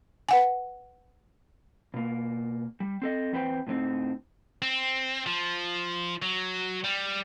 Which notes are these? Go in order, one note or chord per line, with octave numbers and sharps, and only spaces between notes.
B4 F#5 G#5
B2 A#3
G3
C4 A4 D#5
E2 C4 B4 C5 G5
A2 D3 B3 C4 D#4
C4
F3
F#3
G3